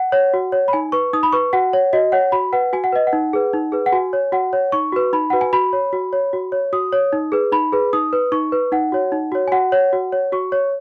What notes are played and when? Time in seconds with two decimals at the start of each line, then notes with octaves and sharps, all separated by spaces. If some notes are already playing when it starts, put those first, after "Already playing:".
Already playing: F#5
0.12 C#5
0.34 F#4
0.52 C#5
0.68 B5
0.73 D#4 G#5
0.92 B4 C#6
1.13 D#4 D#6
1.23 B5
1.33 B4 C#6
1.53 F#4 F#5
1.73 C#5
1.93 F#4 D#5
2.12 C#5 F#5
2.32 F#4 B5
2.53 B4 F#5
2.73 F#4 G#5
2.84 F#5
2.92 B4 D#5
3.07 F#5
3.13 D#4
3.33 G#4 B4
3.53 D#4
3.72 G#4 B4
3.86 F#5
3.92 F#4 G#5
4.13 C#5
4.32 F#4 F#5
4.53 C#5
4.72 D#4 C#6
4.92 F#4 B4
5.13 D#4 B5
5.30 F#4 B4 F#5
5.41 G#5
5.53 F#4 B5
5.73 C#5
5.93 F#4
6.13 C#5
6.33 F#4
6.52 C#5
6.73 F#4 D#6
6.93 C#5
7.13 D#4
7.32 G#4 B4
7.52 D#4 B5
7.72 G#4 B4
7.93 D#4 D#6
8.13 B4
8.32 D#4 C#6
8.52 B4
8.72 D#4 F#5
8.92 F#4 C#5
9.12 D#4
9.32 F#4 C#5
9.48 G#5
9.52 F#4 F#5
9.72 C#5
9.93 F#4
10.12 C#5
10.32 F#4 C#6
10.52 C#5